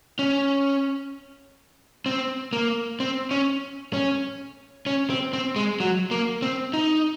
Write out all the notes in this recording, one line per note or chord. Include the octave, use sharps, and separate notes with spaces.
C#4
C4
A#3
C4
C#4
C#4
C#4
C4
C4
G#3
F#3
A#3
C4
D#4